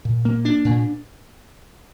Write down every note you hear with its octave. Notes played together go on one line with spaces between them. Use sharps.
A#2
A#3
D4
A#2